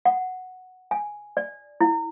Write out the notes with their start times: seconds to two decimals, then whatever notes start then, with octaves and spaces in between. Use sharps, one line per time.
0.05 F#5
0.91 G#5
1.37 D5
1.81 E4